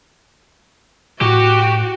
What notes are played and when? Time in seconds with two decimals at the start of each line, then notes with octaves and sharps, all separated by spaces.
1.21 A2 F#4 G4